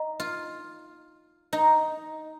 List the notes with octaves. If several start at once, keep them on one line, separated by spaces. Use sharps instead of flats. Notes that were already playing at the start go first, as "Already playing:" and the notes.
Already playing: D#4
F4
D#4